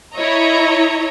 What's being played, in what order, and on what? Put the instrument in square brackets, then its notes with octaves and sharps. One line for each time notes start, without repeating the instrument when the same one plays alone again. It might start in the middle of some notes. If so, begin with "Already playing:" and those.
[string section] E4 C#5 D#5 A#5